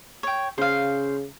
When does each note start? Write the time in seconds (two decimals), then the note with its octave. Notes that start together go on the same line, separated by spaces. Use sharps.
0.23 C#5 G5
0.58 C#3 C5 F5